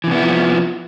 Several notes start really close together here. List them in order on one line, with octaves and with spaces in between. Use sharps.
E3 C3 B3 E4 F3